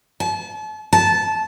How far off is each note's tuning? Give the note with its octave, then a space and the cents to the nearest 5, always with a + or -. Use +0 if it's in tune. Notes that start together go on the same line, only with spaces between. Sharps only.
A5 -35
A5 -15